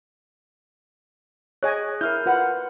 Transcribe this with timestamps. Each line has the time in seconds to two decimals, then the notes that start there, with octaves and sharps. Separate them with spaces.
1.63 G#4 C#5 D#5 G#5 F#6
2.01 E4 A#4 F6 G6
2.26 F4 B4 F#5